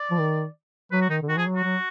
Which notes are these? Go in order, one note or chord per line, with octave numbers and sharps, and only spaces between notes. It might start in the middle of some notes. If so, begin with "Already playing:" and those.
Already playing: D5
F3
D#3
F#3 B4
F#4
D#3 D#4
D3
D#3 F#4
F3 G#4
F#3
F#4
F#3